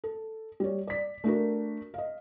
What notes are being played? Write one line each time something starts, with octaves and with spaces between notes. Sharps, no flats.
A4
G3 C#5
D5 B6
A3 D4 F#4 A#4
D#5 F5